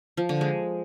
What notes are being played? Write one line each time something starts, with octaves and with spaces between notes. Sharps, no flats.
F3
D3
G#3